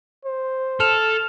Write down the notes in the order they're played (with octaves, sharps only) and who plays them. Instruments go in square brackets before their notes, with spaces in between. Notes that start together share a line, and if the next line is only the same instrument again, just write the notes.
[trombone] C5
[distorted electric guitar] A4 [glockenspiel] F6 E7 F7